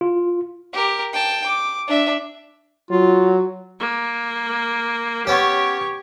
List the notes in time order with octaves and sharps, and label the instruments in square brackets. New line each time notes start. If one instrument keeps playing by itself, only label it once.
[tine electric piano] F4
[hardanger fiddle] G4 A#4
G5 A5
D6
D4 E5
[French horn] F#3 [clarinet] F4
[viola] A#3
[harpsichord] B3 C#4 [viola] G4 C#5